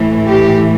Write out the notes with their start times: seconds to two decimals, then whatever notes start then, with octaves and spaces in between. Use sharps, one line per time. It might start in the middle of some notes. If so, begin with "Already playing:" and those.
Already playing: A2 E3 A3
0.28 G4